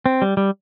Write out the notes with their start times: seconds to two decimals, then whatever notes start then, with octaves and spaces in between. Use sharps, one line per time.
0.06 C4
0.22 G3
0.37 G3